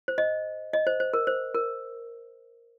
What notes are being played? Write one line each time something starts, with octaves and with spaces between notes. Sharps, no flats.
C5
D#5
D#5
C5
C5
A#4
C5
A#4